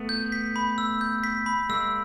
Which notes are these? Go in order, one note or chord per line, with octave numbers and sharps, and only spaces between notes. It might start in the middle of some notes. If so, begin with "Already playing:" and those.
Already playing: A3 B3
G6
B6
B5
E6
G6
B6
B5
G#3 A#3 E6